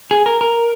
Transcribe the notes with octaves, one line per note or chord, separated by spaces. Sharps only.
G#4
A#4
A#4